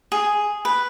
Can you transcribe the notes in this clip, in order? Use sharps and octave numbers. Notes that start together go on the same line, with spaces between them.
G#4
B4